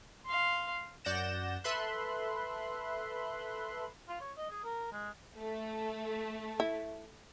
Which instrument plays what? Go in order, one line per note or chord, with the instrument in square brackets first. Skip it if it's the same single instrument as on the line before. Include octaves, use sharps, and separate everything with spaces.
[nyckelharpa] F5 C6
[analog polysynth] F#2 D5 F#5 G6 A#6 E7
A4 B4 E5 B5 C6 F#6
[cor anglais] F4
C#5
D#5
G#4
A#4
G#3
[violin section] A3
[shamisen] E4